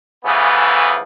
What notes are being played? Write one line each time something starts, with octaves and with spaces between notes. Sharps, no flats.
C#3 E3 F3 A3 B3